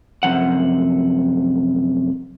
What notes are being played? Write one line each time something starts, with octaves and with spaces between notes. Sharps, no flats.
F#2 C3 F3 F#5